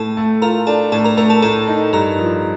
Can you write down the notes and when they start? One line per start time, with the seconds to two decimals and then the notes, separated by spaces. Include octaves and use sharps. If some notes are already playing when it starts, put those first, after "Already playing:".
Already playing: A2 A4 A5
0.17 A3
0.42 F4 A#4 A#5
0.66 D4 A4 A5
0.92 A2 A4 A5
1.04 A#4 A#5
1.17 A3 A#4 A#5
1.30 A4 A5
1.42 A2 A4 A5
1.68 D#4
1.93 G2 A#4 A#5
2.18 F3